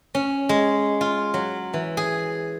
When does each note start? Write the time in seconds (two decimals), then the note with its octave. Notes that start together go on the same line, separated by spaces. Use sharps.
0.15 C#4
0.49 G#3
1.01 F4
1.34 F#3
1.74 E3
1.97 G#4